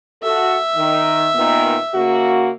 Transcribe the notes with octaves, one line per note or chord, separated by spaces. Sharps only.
F#4 A4 E5
D#3
A#2 D#3 B3
C#3 A#3 F#4